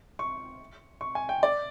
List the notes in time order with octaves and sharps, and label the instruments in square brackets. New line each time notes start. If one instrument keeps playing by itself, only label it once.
[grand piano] C#6
C#6
G#5
G5
D5